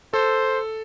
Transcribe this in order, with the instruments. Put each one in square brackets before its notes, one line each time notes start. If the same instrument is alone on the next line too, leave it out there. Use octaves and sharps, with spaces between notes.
[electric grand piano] A4 [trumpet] C5